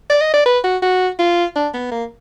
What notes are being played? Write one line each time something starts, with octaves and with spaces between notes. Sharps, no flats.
D5
D#5
D5
B4
F#4
F#4
F4
D4
B3
A#3